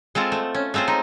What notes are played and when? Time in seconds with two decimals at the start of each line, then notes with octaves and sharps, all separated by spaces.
0.15 G#3 C4 F4 A4
0.32 A3
0.55 C#4
0.74 G#3 A3 C4 F4 C5
0.88 D#4